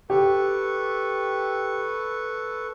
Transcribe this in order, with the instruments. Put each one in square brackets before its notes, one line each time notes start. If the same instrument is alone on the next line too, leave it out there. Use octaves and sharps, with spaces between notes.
[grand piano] G4 [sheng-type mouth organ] A4 B4 C#6